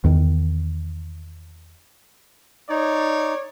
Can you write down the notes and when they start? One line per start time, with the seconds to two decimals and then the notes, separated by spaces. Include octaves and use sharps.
0.04 E2 D#3
2.70 D#4 C#5 D5